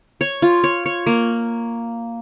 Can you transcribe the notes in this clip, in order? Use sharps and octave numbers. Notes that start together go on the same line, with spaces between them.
C#5
F4
C#5
C#5
A#3